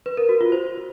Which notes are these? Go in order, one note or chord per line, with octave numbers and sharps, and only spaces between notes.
B4
A#4
F#4
F4
C5